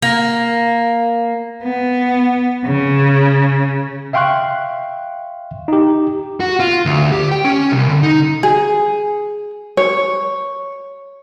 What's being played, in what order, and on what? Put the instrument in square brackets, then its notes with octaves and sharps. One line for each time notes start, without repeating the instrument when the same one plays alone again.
[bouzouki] A#3
[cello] B3
C#3
[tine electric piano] E5 F5 G5 C6 C#6 F#6
D#4 G4
[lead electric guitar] F#4
F4
D2
G4
G5
C#4
C2
D3
D#4
[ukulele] G#4
C#5